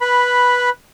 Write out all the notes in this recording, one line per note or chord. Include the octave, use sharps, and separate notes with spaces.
B4 B5